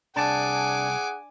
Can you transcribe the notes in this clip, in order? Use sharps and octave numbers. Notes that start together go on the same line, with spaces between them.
C2 D4 G#4 F#5 G#5 A5 D6